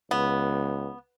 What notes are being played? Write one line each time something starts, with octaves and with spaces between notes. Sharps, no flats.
C#2 B3